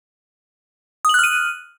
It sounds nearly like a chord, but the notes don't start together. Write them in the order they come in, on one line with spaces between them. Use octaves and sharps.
D#6 F#7 F#6 F6 D#7